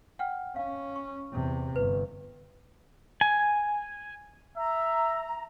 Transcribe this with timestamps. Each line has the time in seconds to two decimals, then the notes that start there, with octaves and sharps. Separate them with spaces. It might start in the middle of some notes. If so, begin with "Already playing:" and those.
0.19 F#5 G5 F6
0.56 C#4 F5
0.96 C#6
1.32 E2 C3
1.76 G1 B4
3.21 G#5
4.56 E5 A#5